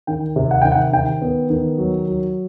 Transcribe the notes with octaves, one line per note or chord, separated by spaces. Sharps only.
D#3 G5
C3
F#5
D#3 G5
F#5
D#3 G5
B3
D#3
F#3
F#3